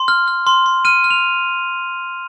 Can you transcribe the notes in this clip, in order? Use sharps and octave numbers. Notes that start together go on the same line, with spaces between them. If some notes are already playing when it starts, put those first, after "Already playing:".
Already playing: C6
F6
F6
C6
C6
F6 D#7
F6
F7